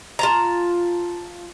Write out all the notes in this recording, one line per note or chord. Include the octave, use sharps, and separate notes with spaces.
F4 A5 A#5